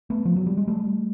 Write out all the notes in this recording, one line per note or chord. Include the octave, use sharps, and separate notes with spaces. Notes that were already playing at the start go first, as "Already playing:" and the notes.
A3 B3
F3
F#3
G3
G#3
G3 A3